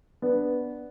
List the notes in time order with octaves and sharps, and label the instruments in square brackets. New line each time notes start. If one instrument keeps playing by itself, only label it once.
[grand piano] B3 D4